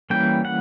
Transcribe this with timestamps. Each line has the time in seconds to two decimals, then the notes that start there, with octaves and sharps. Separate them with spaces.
0.10 E3 G3 A#3 C#4 G5
0.45 F#5